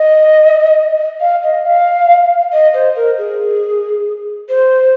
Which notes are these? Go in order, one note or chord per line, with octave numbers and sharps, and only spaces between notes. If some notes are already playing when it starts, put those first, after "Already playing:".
Already playing: D#5
F5
D#5
F5
D#5
C5
A#4
G#4
C5